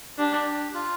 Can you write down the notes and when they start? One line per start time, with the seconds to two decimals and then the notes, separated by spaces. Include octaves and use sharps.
0.18 D4 G4
0.74 F4